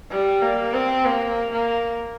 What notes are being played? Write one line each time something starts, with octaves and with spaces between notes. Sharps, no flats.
G3
A#3
C4
A#3
A#3